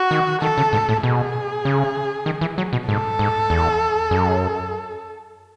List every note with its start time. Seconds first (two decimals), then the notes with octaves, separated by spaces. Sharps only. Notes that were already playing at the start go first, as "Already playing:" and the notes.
Already playing: F#4
0.11 D#3
0.42 D#3 A4
0.58 C#3
0.73 G#2
0.89 A2
1.03 B2 G#4
1.65 C#3
2.26 D#3
2.41 E3
2.58 F#3
2.73 B2
2.88 G#2 A4
3.19 G#2
3.50 E2
4.11 F#2